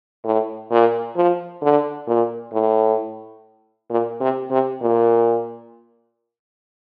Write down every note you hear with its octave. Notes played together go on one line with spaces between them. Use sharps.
A2
A#2
F3
D3
A#2
A2
A#2
C3
C3
A#2